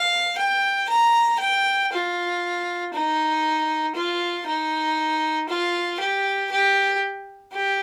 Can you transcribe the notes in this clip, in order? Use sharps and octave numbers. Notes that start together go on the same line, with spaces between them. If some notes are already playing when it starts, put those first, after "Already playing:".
Already playing: F5
G5
A#5
G5
F4
D#4
F4
D#4
F4
G4
G4
G4